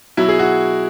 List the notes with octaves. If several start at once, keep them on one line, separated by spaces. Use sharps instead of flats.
B2 F#3 E4
G#4
F#4